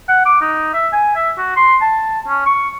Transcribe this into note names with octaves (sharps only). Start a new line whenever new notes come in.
F#5
D6
D#4
E5
G#5
E5
F#4
C6
A5
C#4
C#6